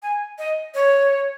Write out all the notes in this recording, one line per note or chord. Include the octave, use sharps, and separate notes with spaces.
G#5
D#5
C#5